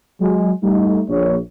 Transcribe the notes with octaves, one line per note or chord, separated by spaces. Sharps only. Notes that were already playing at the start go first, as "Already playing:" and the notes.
F#3 G#3
G3 A3 D#4
A#1 C#5